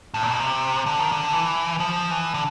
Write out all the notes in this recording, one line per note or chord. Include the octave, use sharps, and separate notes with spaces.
A2
A#2
B2
C3
D3
D#3
D3
E3
F3
E3
D3